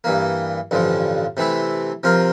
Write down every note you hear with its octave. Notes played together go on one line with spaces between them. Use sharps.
G2 E3 A#3
A1 G2 D3 F3
C3 E3 A3 E4
C3 F3 C4 F4 A#4